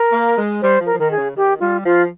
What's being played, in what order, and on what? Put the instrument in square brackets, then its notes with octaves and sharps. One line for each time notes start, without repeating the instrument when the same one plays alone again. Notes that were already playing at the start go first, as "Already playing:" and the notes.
Already playing: [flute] A#4
[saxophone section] A#3
G#3
[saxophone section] G3 [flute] C5
[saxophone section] F3
[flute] A#4
[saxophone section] F3
[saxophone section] D#3 [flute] A#4
[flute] G#4
[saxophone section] C#3
[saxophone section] D#3 [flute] G4
[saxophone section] G3 [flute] F4
[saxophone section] F3 [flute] F4